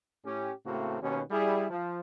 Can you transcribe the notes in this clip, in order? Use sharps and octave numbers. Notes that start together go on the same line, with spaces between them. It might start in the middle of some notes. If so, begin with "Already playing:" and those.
A2 C#4 G4
A2 C#3 A3 A#3 C4 F#4
D#2 B2 C#4
G3 E4 G#4
F3